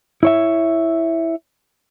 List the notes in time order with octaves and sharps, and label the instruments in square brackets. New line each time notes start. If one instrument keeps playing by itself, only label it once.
[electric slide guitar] E4 C#5 E5